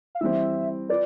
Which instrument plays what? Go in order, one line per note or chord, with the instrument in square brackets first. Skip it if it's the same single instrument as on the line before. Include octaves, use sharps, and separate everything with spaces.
[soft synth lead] F5
[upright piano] E3 G3 C4 [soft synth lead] E5
[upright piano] F4 B4 [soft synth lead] D5